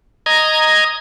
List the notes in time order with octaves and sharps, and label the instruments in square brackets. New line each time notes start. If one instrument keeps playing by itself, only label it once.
[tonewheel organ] D#5 A#5 G#6